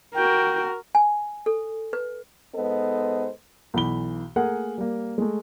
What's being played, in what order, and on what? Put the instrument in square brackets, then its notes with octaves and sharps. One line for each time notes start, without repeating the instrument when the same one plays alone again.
[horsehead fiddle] F#4 A#4 [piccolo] G5
[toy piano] G#5
A4
B4
[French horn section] G#2 B3 A4 B4 C5 D#5
[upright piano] B1 E3 B5 G7
A3 A#3 G#4 A#4 F#5 G#5
G3 A#3
G#3 A3